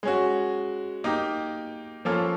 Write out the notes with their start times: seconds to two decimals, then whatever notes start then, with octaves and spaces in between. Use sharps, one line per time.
0.03 G#3 C#4 F#4
1.04 A#3 D#4 G4
2.05 F3 A#3 C#4 F4 A4